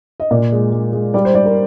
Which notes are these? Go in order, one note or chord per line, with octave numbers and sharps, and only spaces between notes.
D#5
A#2 D5
G#3
G#3
G#3
G3 D5
C5
G3 D5
A#4